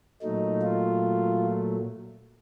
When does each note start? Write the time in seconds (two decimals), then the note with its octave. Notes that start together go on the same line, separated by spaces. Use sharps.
0.22 A#2 F#3 A3 D#4
0.62 F4